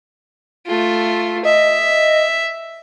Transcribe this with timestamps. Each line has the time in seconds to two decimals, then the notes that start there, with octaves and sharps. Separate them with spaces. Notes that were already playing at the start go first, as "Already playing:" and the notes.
0.66 A3 F4
1.45 D#5 E5